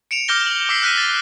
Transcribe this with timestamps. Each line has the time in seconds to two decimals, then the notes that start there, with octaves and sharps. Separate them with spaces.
0.11 C#7 D7 E7 F7
0.28 D6 F6 G6 A#6 G7
0.46 F#7
0.69 D6 E6 B6 C7
0.82 F6 F#6 A#6 B6 D#7
0.97 A6